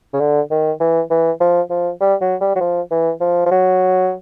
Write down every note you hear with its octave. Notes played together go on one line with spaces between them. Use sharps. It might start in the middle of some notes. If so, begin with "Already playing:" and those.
C#3
D3
D#3
E3
E3
F3
F3
G3
F#3
G3
F#3
F3
E3
F3
F3
F#3